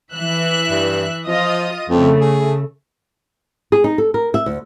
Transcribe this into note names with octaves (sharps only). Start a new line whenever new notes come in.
E3 E5 F#6
G2
F3 F4 D#5 D#6
F2 C#3 A3
G#4
G#4
D#4
A4
A#4
E5
D2